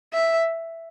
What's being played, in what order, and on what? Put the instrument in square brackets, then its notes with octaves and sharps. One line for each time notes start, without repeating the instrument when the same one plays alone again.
[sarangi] E5